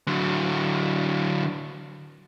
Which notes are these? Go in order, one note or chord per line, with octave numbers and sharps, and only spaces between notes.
D3 F#3